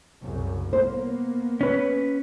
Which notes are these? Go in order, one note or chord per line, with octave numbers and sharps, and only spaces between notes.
C2 F#2 C#3
A#3 B3 C5
C#4 B4